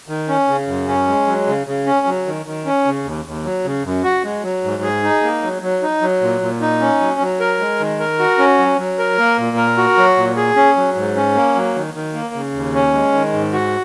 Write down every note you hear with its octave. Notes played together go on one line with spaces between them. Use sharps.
D#3
C#4
C#3
F#2
C#4
G#3
F#3
C#3
C#3
C#4
F#3
D#3
D#3
C#4
C#3
D#2
D#2
F#3
C#3
F#2
F#4
G#3
F#3
G#2
G#4
D#4
A#3
F#3
F#3
D#4
F#3
A#2
A#2
D#4
C#4
F#3
F#3
A#4
G#3
D#3
A#4
F#4
C#4
F#3
F#3
A#4
A#3
A#2
A#4
F#4
F#3
A#2
G#4
C#4
F#3
G#2
C#4
A#3
F#3
D#3
D#3
A#3
C#3
D#2
C#4
G#3
D#3
G#2
F#4